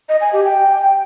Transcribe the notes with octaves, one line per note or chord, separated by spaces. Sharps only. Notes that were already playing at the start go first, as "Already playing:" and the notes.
D#5
G#5
G4
G5